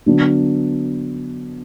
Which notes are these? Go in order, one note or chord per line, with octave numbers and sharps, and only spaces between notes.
D3 F#3 B3 D4